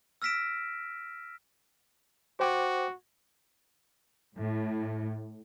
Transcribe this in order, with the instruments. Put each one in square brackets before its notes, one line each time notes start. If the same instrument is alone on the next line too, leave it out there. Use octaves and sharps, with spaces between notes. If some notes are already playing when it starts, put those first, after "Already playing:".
[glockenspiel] E6 F6 A#6 B6 D7 E7
[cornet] F#4 [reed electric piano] C5 G5 D6
[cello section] A2